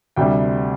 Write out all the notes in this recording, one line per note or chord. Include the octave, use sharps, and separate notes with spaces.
D2 C3 G3 G5